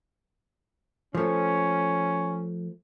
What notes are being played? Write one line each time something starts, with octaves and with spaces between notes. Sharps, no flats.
F3 A3 C#4